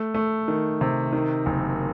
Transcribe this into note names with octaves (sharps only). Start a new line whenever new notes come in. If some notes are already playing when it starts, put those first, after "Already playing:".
Already playing: A3
A3
D#3
C3
D#3
F#1